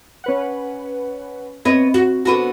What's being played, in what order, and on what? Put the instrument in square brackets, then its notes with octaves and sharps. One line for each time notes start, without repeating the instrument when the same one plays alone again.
[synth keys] C#4 B4 F#5
[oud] B3 C#5 D#5 [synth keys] C4
[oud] F#4
D3 B3 F#4